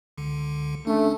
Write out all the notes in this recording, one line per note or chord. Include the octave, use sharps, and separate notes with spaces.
C#2 D3
A3 C#4 D4